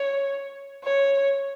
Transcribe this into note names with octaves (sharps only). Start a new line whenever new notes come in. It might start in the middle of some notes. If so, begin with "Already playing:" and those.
Already playing: C#5
C#5